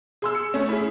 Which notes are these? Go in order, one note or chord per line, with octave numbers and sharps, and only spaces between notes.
G#4 C6 E6
C#7
A3 C#4
E4 G#4